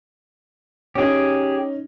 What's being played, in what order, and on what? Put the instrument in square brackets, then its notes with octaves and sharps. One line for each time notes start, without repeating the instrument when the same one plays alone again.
[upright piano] C#4 D#4 [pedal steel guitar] G4 G#4